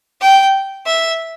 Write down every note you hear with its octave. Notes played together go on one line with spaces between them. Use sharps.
G5
E5